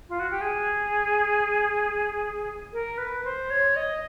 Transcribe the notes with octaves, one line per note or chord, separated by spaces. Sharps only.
F4
F#4
G4
G#4
A#4
B4
C5
C#5
D#5